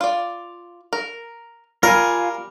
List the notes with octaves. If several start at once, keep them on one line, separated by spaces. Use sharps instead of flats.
F4 D5
A#4
G3 F4 A#4 F5 G#5